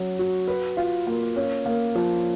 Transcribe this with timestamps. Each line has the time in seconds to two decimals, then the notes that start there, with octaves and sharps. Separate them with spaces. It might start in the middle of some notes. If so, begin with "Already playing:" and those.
Already playing: F#3 C#4
0.19 F#4
0.48 B4
0.77 F4
1.07 A#3
1.36 C#4
1.66 A#3
1.95 F3